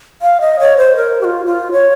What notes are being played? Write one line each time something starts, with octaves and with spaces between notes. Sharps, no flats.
F5
D#5
C#5
C5
A#4
G4
F4
F4
C#5